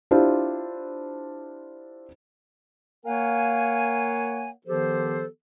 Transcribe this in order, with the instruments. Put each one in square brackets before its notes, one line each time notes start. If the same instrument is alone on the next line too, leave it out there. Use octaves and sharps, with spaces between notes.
[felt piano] D4 E4 F4 G4 C5
[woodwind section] A#3 A#4 C#5 F5 F#5 G#5
D#3 F3 B3 G4 A4 C5